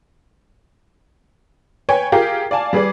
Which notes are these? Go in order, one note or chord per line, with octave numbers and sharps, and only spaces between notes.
B4 C#5 G5 G#5
F4 G4 G#4 A#4 F5 G5
D5 F5 G#5 A5
G3 G#4 B4 D5